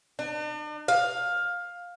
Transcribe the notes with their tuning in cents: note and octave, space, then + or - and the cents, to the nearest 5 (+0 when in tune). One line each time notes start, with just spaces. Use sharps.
D4 +45
F5 +15